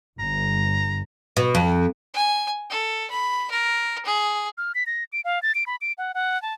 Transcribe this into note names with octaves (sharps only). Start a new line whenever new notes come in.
G1 A#5
B2
F2
G#5
A4
B5
A#4
G#4
F6
B6
A#6
D7
F5
A6
D7
B5
D7
F#5
F#5
A5